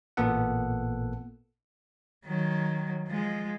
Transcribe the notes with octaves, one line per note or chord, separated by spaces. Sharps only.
A1 A#2 A#3 B3 A4 F#5
D#3 F#3
F3 G#3